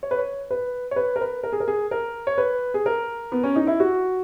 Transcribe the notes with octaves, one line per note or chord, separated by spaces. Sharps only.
C#5
B4
C#5
B4
C#5
B4
A#4
B4
A#4
G#4
A#4
G#4
A#4
C#5
B4
G#4
A#4
B3
C#4
D#4
E4
F#4